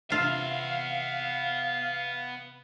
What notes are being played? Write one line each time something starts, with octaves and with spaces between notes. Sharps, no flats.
C3 B3 F4 E5 F5